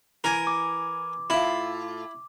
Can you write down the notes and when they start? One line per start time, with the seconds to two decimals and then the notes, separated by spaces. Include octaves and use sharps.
0.24 E3 A#4 G#5
0.47 D6
1.30 A2 E4 F4